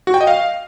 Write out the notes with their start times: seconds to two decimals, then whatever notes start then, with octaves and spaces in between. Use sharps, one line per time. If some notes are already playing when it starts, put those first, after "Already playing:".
0.07 F#4
0.14 G5
0.21 D#5
0.27 F5